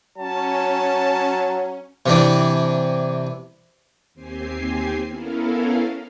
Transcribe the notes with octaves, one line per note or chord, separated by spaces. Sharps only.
F#3 C#4 A5
C3 E3 D4
D#2 C4 G4 G#5 C7
B3 C#4 E4 A4 A#4 F5